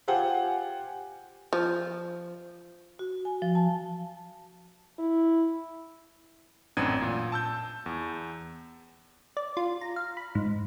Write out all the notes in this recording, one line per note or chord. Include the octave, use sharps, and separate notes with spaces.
F4 G4 C5 F#5 G#5
F3
F#4
G#5
F3
A5
E4
A1 F#2 C4 D4 G#6 D#7
A#2
A5 E6 G6
E2
D5
F4
A#5
F5
B5
G#2